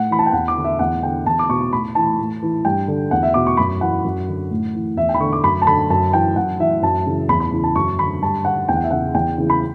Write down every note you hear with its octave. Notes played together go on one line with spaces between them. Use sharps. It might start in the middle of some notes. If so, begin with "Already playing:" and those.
Already playing: A2 F#5
E3 B5
A5
G5
E2 F#5
D6
D3
E5
E2 F#5
D3 G5
E2 A5
D6
B2 C#6
A2 B5
E3 A5
A2
E3
G2 G5
D3
E2 F#5
E5
B2 D6
C#6
F#2 B5
E3 F#5
F#2
D3
A2
E3
E2 E5
G5
B5
D3 C#6
D6
F#2 B5
A5
D3 B5
F#2 A5
E3 G5
F#2 F#5
E3 E5
F#2 A5
C#3 E3
E2 B5
B5
C#3 E3
A5
F#2 C#6
D3 B5
G2 A5
D3 F#5
E2 G5
F#5
E5
C#3 E3 F#5
E2 G5
C#3 E3
B5